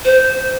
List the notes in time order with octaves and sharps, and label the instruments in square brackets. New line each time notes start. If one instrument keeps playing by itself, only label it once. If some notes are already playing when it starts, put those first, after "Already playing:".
[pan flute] C5